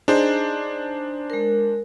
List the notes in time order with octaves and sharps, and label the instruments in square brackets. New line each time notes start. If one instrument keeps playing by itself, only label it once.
[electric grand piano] D4 C5 [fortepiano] D#4 G#4
[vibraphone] G#3 A#4